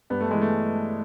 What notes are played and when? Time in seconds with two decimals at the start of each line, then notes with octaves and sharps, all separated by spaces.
0.10 G2 B3
0.21 A3
0.31 E3 G#3
0.41 A3